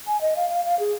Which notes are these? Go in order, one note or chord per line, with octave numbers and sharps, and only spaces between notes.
G#5
D#5
F5
F5
F5
G#4